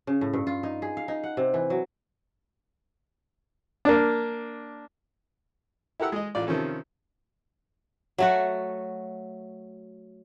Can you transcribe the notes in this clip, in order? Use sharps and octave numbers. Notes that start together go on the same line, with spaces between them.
C#3
A2
G2
F4
D#4
G#4
F5
D#4
F#5
C3
E3
F#3
A#3 D4
E4 G4 A#4 F#5 E6
G#3 D#5
A1 F4 D5
C3 D#3 F3 C#4 A4
F#3 A3 F#4